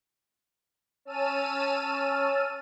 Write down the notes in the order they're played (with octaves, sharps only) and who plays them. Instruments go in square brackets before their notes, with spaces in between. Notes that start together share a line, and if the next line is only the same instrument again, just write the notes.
[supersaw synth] C#4 A5 E6 F6 D#7